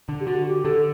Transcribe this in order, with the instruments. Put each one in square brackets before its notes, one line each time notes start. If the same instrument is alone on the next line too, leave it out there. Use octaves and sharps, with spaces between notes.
[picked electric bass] D3
[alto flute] G4
[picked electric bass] D3 [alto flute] F#4
[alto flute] G4
[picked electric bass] D3 [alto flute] A4